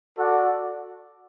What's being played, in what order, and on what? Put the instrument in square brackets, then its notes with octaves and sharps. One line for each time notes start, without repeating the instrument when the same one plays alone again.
[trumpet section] F#4 A4 D5 F#5